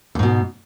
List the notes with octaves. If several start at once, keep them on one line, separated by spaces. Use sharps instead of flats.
E2 G#2 B2